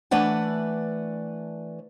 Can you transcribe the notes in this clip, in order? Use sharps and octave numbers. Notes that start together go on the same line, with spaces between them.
E3 A3 D4 B4 D5 F#5